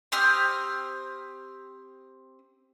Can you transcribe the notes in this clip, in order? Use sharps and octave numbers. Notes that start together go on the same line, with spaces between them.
C4 G4 D#6 F6